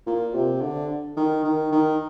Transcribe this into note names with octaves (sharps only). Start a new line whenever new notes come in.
A#2
C3
D3
D#3
D#3
D#3